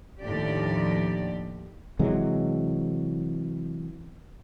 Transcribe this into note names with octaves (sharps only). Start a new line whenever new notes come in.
D#2 A2 D3 F3 G4 D5
C3 E3 F#3 G#3